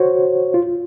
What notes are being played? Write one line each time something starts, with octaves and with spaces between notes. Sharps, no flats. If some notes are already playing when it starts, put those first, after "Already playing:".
Already playing: F#4 C5 C#5
F4